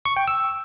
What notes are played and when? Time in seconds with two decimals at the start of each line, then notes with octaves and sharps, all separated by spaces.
0.05 C#6
0.16 G5
0.28 E6